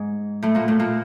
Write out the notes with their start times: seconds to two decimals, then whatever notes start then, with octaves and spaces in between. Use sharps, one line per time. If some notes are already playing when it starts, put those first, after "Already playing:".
Already playing: G#2 G#3
0.42 A2 A3
0.55 A#2 A#3
0.68 A2 A3
0.79 A#2 A#3